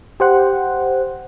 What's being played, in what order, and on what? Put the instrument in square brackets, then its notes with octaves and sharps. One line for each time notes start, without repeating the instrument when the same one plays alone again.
[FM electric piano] G4 C5 F#5